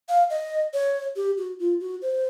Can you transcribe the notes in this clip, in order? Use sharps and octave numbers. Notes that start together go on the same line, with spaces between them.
F5
D#5
C#5
G4
F#4
F4
F#4
C5